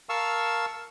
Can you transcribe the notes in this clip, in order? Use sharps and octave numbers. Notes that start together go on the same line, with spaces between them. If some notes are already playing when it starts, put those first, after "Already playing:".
A#4 F5 A5 C#6 E6